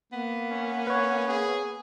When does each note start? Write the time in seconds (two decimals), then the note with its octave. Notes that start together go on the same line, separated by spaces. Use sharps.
0.13 A#3 B3
0.51 C#4
0.87 B4 C#5
1.28 G#4